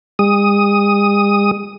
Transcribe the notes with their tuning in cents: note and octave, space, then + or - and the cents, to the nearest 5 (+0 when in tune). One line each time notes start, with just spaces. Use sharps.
G#3 -45 D#6 +5